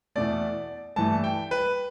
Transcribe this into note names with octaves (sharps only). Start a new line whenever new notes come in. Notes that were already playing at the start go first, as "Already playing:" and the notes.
E2 B2 A3 D5
G2 E3 A3 A5
G5
B4